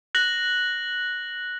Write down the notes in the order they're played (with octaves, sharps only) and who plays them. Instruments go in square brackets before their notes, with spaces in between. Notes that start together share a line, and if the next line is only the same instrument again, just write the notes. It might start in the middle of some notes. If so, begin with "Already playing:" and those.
[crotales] F#6 A#6 F#7